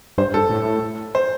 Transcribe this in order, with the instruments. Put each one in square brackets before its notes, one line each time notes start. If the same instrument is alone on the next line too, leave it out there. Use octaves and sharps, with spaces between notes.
[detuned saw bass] G2 [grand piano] C5
[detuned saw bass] G2 [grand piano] A4
[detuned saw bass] A2
[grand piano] C5